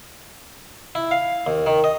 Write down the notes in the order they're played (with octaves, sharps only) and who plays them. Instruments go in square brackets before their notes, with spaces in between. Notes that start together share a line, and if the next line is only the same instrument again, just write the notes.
[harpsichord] E4
F5
D#2
D#3
D#5